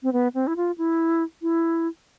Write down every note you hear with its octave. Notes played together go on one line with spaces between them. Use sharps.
C4
B3
C4
E4
F4
E4
E4